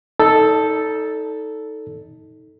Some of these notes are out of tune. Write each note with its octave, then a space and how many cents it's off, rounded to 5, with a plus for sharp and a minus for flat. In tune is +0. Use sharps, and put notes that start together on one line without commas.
D#4 +20 A4 +0 D5 -30